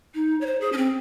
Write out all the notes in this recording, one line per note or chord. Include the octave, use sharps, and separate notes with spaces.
D#4
C#5
C5
G#4
C#4
C4